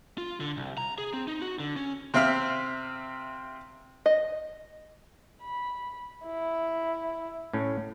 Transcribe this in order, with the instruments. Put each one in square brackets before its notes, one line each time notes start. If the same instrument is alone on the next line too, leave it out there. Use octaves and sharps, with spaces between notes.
[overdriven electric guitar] F4
D3
C2
A#5
G#4
C4
D#4
F#4
D3
C#4
[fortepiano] C3 C4 E5 F5 F6
[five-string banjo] D#5
[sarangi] B5
E4
[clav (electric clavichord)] A2 C#4